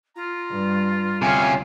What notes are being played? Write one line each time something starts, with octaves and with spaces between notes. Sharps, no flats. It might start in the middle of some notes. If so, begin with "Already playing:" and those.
F4 A#5
G2
D2 C3 C#4 F5 G#5 F6